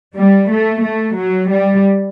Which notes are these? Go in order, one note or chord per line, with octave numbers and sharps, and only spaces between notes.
G3
A3
A3
F#3
G3